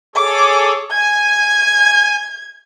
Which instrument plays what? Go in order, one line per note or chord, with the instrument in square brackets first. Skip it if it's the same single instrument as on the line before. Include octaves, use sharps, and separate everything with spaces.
[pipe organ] G#4 A4 C#5 [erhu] D6
[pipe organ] G#5 [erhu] G#6